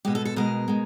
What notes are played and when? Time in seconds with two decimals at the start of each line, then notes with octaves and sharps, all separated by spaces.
0.05 B2 G#3 G4
0.15 A4
0.25 A4
0.36 B2 G#3 A#4
0.68 B2 G#3